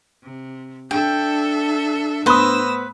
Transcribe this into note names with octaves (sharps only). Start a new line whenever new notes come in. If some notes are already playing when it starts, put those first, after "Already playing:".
C3
D4 A4 E5 G5
A2 B3 B4 C5 B5 D#6 E6 A#6